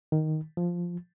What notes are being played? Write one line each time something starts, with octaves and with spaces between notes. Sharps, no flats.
D#3
F3